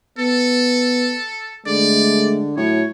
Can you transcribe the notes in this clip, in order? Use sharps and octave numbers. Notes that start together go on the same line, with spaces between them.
B3 A4
D3 G#3 A3 D5
A2 F#3 C#5